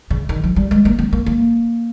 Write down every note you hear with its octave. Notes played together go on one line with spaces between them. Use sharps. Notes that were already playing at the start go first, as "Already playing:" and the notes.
C#3
D#3
F3
G3
G#3
A#3
C4
A#3
A#3